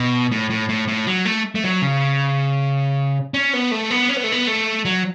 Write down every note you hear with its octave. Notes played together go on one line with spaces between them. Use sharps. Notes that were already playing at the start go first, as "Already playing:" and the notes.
Already playing: B2
A2
A2
A2
A2
F#3
A3
A3
F#3
C#3
C#4
B3
A3
B3
C#4
B3
A3
B3
A3
F#3